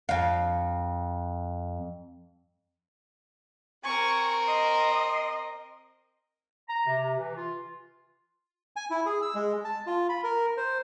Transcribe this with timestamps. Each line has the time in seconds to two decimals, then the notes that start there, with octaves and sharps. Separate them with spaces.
0.09 F2 F5
3.84 C4 A#4 G#5 C#6
4.47 D#5 C6
6.69 A#5
6.86 C3
7.18 E3
7.35 F4
8.76 G#5
8.91 E4
9.06 G#4
9.22 E6
9.35 G#3
9.64 A5
9.87 F4
10.09 B5
10.24 A#4
10.57 C5